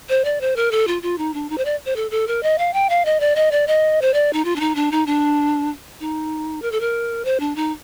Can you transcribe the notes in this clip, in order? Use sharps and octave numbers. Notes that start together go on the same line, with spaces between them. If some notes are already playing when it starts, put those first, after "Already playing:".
C5
D5
C5
A#4
A4
F4
F4
D#4
D4
D#4
C5
D5
C5
A4
A4
A#4
D#5
F5
G5
F5
D#5
D5
D#5
D5
D#5
C5
D5
D#4
F4
D4
D#4
D4
D#4
D4
D#4
A#4
A4
A#4
C5
D4
D#4